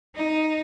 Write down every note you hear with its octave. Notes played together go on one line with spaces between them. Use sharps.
D#4